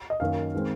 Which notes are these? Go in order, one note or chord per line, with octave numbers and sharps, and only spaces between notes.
D#5
F#2 D#3 A#3 F5
D#3 G#3 C4